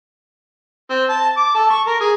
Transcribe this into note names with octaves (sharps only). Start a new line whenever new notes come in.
C4
A5
D6
A4
C#6
A#4
G#4